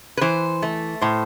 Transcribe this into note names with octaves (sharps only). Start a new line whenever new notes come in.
B4
E3 C5
A3
A2 C5